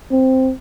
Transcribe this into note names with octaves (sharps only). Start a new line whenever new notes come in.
C4